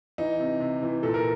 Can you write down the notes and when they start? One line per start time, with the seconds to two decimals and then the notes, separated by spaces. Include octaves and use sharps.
0.18 E3 D#4
0.40 C3
0.60 C3
0.82 E3
1.03 A#2 A4
1.14 A#4